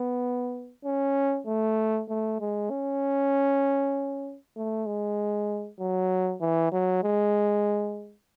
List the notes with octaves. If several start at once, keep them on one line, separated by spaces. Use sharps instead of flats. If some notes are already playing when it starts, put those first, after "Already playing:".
Already playing: B3
C#4
A3
A3
G#3
C#4
A3
G#3
F#3
E3
F#3
G#3